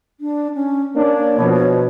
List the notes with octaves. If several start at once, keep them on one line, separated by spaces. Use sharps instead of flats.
D4
C#4
A#3 D4 C#5
B2 F3